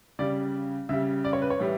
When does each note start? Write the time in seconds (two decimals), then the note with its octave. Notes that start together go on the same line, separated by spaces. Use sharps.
0.19 C#3 G3 D5
0.89 C#3 G3 E5
1.24 D5
1.33 C#5
1.42 B4
1.50 C#5
1.60 A2 E3 G3